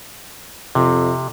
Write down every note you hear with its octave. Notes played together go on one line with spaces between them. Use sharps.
F2 C3